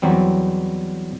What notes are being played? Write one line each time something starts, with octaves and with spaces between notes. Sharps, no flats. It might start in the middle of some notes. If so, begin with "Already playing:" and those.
E2 F#3 G3 C4